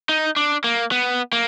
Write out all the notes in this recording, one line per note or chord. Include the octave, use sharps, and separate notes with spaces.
D#4
D4
A#3
B3
A#3